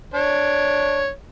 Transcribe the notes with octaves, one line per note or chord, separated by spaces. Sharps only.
D4 C#5